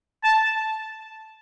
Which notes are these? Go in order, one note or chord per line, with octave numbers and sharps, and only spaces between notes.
A5